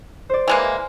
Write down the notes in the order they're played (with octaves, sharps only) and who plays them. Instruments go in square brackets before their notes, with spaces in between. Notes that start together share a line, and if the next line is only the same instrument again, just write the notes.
[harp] C5 D5
[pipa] E3 G#3 A#3